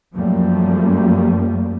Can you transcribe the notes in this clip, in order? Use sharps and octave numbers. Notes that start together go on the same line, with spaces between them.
F#2 F3 G3 A3 A#3